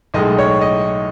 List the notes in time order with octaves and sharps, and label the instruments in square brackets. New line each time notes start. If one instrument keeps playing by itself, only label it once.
[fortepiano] B1 A2 G#3 D#5
C#5
D#5